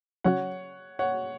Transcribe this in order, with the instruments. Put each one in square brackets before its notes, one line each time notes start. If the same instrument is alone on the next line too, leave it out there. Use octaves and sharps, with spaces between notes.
[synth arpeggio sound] C#3 F#3 C#4 F#4 [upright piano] C#5 F#5
[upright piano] C#5 F#5